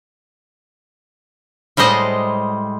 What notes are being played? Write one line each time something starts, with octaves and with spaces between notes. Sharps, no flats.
A2 G3 G#3 C5 D#5